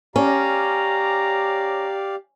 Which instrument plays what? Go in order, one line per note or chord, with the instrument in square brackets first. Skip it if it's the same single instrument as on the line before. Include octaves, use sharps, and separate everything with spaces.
[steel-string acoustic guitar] C#4 [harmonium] G4 D5 F5 [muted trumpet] A#5